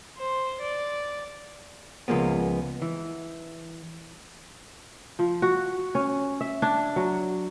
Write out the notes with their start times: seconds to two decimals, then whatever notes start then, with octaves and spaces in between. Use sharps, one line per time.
0.18 C5
0.61 D5
2.08 C#2 F3 G#3 A#3 B3
2.82 E3
5.19 F3
5.42 F#4
5.95 C#4
6.41 E5
6.62 D4
6.96 F#3